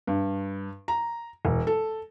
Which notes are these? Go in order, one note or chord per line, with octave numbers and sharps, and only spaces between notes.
G2
A#5
E1
A4